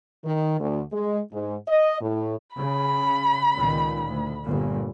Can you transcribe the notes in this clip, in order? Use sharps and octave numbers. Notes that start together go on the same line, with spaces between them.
D#3
D2
G#3
G#2
D#5
A2
C#3 B5
C#2 A#2 D#3
D2
G1 A#2